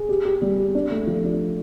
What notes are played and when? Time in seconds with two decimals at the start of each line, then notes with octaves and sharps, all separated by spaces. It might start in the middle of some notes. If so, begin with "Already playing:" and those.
Already playing: G#4
0.09 G4
0.25 G4
0.42 G3
0.58 G4
0.75 D4
0.91 A3
1.07 F3
1.24 D4